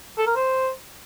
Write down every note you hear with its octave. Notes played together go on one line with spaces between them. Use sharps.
A4
A#4
C5